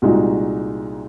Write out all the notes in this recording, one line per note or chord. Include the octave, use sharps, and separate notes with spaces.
C2 A#2 G#3 D#4 F#4